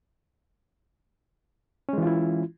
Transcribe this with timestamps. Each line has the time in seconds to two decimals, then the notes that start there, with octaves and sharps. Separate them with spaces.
1.89 C#4
1.93 G#3
1.98 E3
2.02 F4
2.07 E4